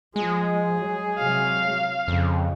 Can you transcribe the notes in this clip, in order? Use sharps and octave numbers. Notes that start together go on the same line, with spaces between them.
F3 G#3 G#4
F#3
C3 F#3 F5
F2 C#3